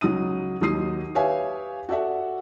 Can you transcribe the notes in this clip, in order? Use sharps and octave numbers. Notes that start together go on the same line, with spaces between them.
C#2 F#3 D#4 D#6 D#7
D#2 F#3 D#4 D#6 C7 D#7
G4 B4 C#5 E5 F5 G#5
F#4 A4 D5 E5 F#5